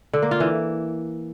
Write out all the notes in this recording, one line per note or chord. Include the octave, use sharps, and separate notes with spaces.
D3
A#3
F4
E3